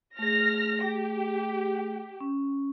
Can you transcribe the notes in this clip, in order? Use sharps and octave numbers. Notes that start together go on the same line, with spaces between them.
A3 G#4 F6 A#6
G4
C#4